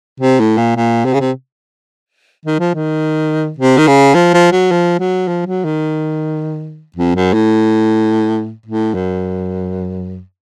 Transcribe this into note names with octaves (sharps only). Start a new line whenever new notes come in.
C3
A2
A#2
A#2
C3
C#3
C3
D#3
F3
D#3
C3
D#3
C#3
F3
F3
F#3
F3
F#3
F3
F#3
D#3
F2
F#2
A2
A2
F#2